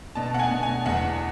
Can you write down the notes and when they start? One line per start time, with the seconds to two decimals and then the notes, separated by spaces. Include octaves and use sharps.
0.15 B2 A5
0.34 F#5
0.39 G#5
0.51 B2
0.63 G#5
0.86 E2 F#5